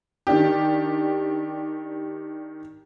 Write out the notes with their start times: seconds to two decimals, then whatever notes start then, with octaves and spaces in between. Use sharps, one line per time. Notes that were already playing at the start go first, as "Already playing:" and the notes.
0.27 D#3 D4 G4